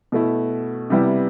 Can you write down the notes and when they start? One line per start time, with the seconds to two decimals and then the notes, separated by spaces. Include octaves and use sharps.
0.12 B2 A3 E4
0.90 C3 G3 B3 E4